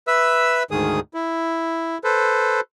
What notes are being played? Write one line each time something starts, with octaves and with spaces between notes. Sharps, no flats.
B4 E5 E6
D2 G#2 D#3 G#4 D#6
E4
A4 B4 C5